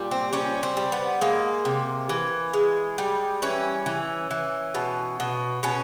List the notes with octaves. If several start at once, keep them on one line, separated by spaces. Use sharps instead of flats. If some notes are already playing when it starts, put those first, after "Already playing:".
Already playing: A#2 G3
C4
G3 C#4
C4
G3
B3
G#3 A#3
C3
E3
G#3
G3
E3 C#4
E3
E3
B2
B2
B2 C#4